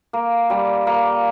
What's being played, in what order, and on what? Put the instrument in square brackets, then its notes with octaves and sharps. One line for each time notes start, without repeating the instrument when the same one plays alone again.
[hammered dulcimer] A#3
G3
A#3